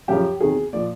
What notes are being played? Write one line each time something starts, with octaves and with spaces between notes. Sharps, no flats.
F#2 C#3 F3 G4
E2 C3 D#3 F#3 G#4
A#2 F3 D5